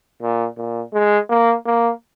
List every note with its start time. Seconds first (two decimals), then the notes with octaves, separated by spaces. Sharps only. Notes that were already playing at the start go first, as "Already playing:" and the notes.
0.21 A#2
0.57 A#2
0.93 G#3
1.29 A#3
1.66 A#3